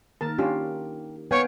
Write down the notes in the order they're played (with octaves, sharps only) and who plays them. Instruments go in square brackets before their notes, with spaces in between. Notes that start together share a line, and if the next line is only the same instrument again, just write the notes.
[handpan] D#3 A#3 A#4 [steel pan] A5
[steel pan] C#4 D4 F4 [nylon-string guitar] G4
[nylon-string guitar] B3 [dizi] C#5 [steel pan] F5 G5 G#5